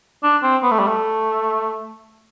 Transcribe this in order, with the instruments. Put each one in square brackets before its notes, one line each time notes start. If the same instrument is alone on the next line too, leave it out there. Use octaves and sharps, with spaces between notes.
[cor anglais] D4
C4
B3
A3
G3
A3